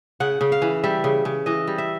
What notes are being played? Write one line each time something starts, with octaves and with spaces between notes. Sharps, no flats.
C#3 F#5
C#3
F5
E3
G3 E5
C#3
C#3
E3 D#5
G3
E5